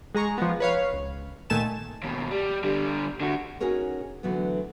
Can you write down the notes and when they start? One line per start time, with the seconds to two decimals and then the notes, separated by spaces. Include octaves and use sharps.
0.15 G#3 G#4 A#5 C#6
0.38 F3 G#3 B3
0.60 B4 C#5 F5
0.93 C#2
1.50 A#2 D#3 A3 G#5 A5 E7
2.03 D#2 B2
2.31 G3
2.64 D3 G3
3.21 D3 F#4
3.60 C#4 D#4 F#4 G#4 A#4 C#5
4.23 D3 E3 F#3 A3 B3